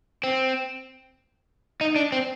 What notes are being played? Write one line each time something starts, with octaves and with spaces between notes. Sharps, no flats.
C4
D#4
D4
C4